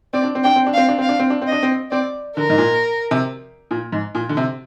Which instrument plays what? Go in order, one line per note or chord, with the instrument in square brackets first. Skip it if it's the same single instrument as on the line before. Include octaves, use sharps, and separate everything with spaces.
[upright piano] C4 [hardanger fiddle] D5
[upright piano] D4
C4
[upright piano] D4 [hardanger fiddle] G5
[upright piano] C4
D4
[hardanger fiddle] F5
[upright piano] C4
D4
[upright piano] C4 [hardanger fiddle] F5
[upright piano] D4
C4
D4
C4
[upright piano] D4 [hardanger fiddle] D#5
[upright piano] C4
[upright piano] C4 [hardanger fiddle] D5
[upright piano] D3 [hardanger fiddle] A#4
[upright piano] G#2
A#2
C3
A#2
G#2
A#2
D3
C3